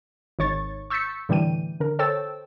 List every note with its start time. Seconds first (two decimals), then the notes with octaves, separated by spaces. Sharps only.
0.39 G#1 D#3 C#5 C#6 A6
0.90 C#6 E6 G6 A6 B6 C#7
1.29 A2 D3 E3 G3 G5 D#7
1.80 D3 A#4
1.99 A4 C5 C#5 G5 E6 A6